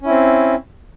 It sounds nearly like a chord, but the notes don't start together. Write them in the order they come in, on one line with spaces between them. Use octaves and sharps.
C#4 E4 C4